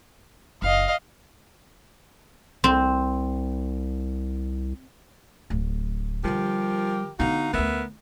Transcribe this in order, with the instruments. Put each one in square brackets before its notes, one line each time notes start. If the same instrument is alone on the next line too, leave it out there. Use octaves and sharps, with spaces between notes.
[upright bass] F#1 [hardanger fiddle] D#5 F5
[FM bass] C2 [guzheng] C4
[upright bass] D1
[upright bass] D3 G3 [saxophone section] F3 G4 A#4
[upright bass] D3 B3 [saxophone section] D#4 F#4 F5
[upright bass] D2 C#4 [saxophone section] B3 A#4 E5